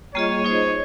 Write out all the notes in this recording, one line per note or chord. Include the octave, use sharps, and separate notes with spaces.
G3 A#3 F4 G#4 C#5 D#5
D#4 G#4 C5 D#5